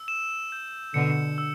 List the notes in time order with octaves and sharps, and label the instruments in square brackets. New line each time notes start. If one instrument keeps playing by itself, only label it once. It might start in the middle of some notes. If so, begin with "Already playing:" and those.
Already playing: [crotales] E6
E7
G6
[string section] B2 D3 [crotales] C#7
[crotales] E6